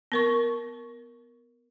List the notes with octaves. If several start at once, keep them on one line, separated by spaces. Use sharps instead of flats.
B3 A#4 C#6